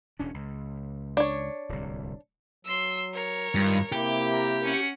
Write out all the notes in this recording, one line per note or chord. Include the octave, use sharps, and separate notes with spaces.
E1 C#4 D4
C#2
D4 C#5
D1 C2
F#3 C6 E6
A#4 C#5
G2 D#3 F4
C3 A#3 E4 G4
A#4
C#4 F#5